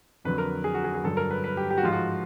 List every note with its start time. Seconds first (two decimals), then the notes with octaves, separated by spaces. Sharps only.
0.24 F2 D3 F#3 B4
0.38 A#4
0.64 G#4
0.74 F#4
0.84 G#4
0.94 G#4
1.03 G2 D3 F#3 A4
1.17 A#4
1.31 B4
1.44 B4
1.57 G4
1.70 G4
1.78 F#4
1.83 G#2 F3 F4
1.92 F#4